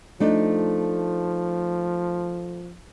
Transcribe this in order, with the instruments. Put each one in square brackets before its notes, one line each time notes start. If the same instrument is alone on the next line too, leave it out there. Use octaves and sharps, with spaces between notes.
[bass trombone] F3 [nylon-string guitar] A3 D4 D#4